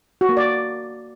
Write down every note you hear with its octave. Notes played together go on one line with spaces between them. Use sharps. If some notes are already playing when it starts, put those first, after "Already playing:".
F#4
A#3
D5